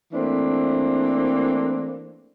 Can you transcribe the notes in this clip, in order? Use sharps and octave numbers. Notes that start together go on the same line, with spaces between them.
E3 A3 A#3 C4 D4